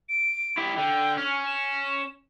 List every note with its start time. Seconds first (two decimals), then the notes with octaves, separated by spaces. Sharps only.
0.09 D7
0.58 E4 G4
0.78 D3 G5
1.18 C#4 F6
1.46 E7